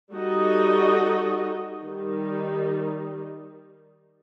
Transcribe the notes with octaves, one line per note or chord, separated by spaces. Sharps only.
G3 D#4 F#4 A4 D#5
D#3 G3 D#4